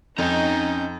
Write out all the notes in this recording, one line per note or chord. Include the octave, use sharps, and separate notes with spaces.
F2 C#4 D#4 G5 A#5